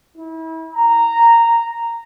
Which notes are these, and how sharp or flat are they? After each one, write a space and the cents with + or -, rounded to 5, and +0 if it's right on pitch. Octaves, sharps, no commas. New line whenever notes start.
E4 -35
A#5 -10